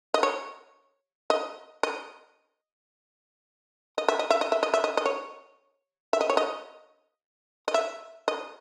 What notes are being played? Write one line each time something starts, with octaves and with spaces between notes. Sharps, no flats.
D#5
C#5
D#5
D#5
D#5
E5
D#5
E5
D#5
E5
D#5
E5
D#5
D#5
C#5
E5
D#5
C#5
D#5
D#5
E5
D#5